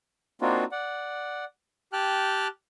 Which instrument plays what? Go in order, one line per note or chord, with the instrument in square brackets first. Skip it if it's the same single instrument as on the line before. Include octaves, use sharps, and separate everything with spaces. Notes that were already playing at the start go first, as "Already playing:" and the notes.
[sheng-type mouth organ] A#3 C4 D4 D#4 F4 F#4
D5 F#5
G4 G5 A5 F6 F#6